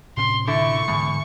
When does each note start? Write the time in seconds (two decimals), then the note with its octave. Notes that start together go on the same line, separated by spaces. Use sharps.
0.17 A2 C3 C#4 C6
0.47 D3 A3 E4 C#6
0.88 E2 G#2 D3 G#3